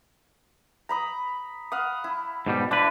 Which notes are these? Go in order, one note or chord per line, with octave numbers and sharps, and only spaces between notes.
A#5 B5 D#6
F5 F#5 D#6
E4
G#2 B2 G3
D4 E4 B4 C5